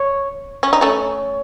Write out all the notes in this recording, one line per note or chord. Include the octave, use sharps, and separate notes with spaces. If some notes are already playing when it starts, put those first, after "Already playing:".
Already playing: C#5
C#4 C#5
D#4
A3 C#4